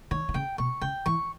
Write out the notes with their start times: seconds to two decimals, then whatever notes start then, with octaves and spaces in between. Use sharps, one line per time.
0.11 D#3 C#5
0.29 D#3
0.34 C#3 G5
0.58 B2 C#6
0.81 C#3 G5
1.06 E3 C#6